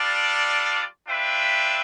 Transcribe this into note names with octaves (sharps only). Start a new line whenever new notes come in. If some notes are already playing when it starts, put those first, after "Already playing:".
Already playing: G3 D4 F4 A4 D5
D4 F4 B4 E5 G5